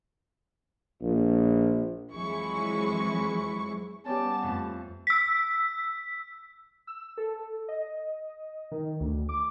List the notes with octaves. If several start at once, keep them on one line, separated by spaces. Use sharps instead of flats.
A#1
F2 E3 F#3 G#3 E4 C#6
G3 B3 C#4 G5 A5 D6 A6
F2 A3
E6 B6
E6
A4
D#5
D#3
D2
D6